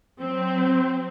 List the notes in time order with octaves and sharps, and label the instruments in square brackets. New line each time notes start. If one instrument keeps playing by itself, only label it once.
[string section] F#3 C4